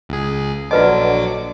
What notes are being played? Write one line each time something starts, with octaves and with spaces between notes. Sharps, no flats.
C#2 G#4
A#1 D3 F#3 F4 B4 D#5 D6